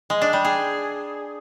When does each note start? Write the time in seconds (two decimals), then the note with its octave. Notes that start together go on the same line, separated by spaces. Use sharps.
0.10 G#3
0.22 D4
0.33 G3
0.45 G#4